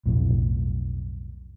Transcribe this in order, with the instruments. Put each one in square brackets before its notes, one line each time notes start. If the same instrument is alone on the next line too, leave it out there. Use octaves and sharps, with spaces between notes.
[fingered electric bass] B1 F2 A2